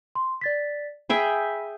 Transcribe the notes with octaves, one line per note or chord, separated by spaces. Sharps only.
C6
D5 A6 B6
G#4 E5 G5 B5